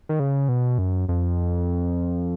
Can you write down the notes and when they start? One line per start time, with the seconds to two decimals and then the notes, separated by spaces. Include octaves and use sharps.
0.09 D#3
0.20 C#3
0.49 B2
0.78 F#2
1.09 F2